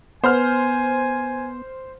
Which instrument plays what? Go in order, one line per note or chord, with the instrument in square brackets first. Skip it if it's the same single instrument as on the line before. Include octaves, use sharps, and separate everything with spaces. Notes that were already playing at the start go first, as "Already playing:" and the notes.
[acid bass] B3 [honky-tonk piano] C5 F6 [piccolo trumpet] G#5